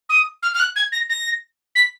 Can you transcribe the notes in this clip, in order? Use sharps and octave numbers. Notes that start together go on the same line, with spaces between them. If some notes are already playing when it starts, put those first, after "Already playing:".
D#6
F6
F6
F#6
G#6
A#6
A#6
B6